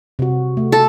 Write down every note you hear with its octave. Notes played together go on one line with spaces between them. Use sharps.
C3 F#4
A3
A4